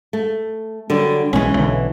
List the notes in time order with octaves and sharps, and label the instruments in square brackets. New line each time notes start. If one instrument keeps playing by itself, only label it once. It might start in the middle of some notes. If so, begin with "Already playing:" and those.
[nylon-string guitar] A3
D3 F#3 G3
[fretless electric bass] B1 G#3 [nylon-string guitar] E3 C#4
[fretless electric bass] B1 D3